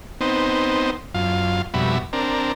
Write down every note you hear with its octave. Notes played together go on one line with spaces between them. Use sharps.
B3 C4 D#4 C5
F#2 F4 F5
F2 B2 G3 F#4 E5 B5
C4 D4 A#4